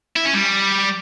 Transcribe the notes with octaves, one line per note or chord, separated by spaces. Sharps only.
E4
C#4
G3